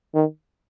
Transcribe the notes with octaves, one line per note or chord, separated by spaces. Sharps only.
D#3